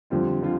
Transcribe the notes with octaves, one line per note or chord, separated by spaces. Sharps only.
F2 D3 G3 C4 F4
D3 G3 F4